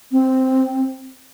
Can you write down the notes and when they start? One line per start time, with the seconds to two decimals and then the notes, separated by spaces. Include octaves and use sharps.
0.12 C4